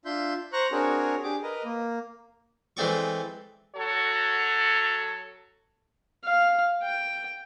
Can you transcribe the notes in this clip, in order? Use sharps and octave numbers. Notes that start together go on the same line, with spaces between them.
D4 F4 E5 C6 G6
C5 A#5 C#6 F#6
C4 D4 F#4 G#4 A#4 C#5
D4 G4 G#4 D6
A#4 B4 D#5
A#3
E3 G#3 A3 C4 D5 C#6
F#3 F#4 A4 C#5
F5
G5